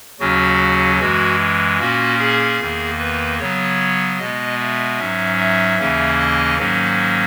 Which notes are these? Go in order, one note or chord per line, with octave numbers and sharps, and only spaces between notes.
D#2 C#3 F#3 C#4 F#4
F#2 E3 G#3 F#4
A#2 A#3 C#4 F#4
G#4
E2 D#3 A#3
B4
C#3 F#3 B3 C#5
B2 G#3 B3 D#5
E5
G#2 F#3 C#4
E5
D#2 C#3 E3 A#3 C#4
D#5
G#2 D#3 F#3 A#3 C#4